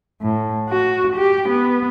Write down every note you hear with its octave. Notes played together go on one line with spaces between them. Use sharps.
A2
F#4
G4
B3